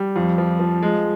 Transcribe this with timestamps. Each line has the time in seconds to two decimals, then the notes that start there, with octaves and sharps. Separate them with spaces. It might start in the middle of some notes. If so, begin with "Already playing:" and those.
Already playing: G3
0.16 F2
0.38 F3
0.60 F3
0.82 G#3